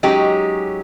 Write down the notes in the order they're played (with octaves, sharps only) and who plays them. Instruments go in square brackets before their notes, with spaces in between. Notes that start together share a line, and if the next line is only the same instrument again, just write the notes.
[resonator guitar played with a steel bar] F#3 G#3 C#4 D#4 G4